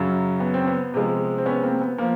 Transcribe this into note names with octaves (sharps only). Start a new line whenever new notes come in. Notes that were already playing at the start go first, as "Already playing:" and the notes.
Already playing: F#2 C#3 F#3
B3
C4
B3
C3 F3 G#3
C4
B3 C#4
A#3 C4
B3
F3 A#3